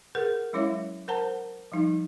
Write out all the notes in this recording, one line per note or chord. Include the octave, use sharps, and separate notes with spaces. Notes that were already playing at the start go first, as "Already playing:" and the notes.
G#4 A#4 B4 F#5
F#3 G#3 C#4 E4 C#5 E5
A#4 C5 F#5 A5 A#5
F3 G3 D#4